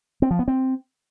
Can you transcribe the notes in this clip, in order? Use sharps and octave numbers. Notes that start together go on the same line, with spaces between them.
C4
F3
B3
C4